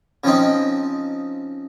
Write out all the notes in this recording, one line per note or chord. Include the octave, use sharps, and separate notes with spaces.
C#3 F3 C4 D#4